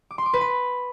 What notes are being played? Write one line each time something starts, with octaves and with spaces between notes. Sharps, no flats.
D6
C6
D6
B4
B5